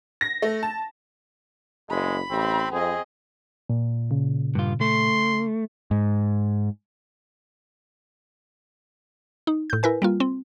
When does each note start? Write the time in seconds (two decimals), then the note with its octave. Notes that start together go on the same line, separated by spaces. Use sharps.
0.21 A#6
0.42 A3
0.63 A5
1.90 F#1 G#3 B5
2.31 A1 C4
2.73 F2 C4 G#4 D#5
3.69 A#2
4.11 C#3
4.55 G2 F4
4.81 A3 C6
5.91 G#2
9.47 D#4
9.70 A2 G6
9.83 E4 A#4 B4 G#5
10.02 G3 A#3 F4
10.20 C4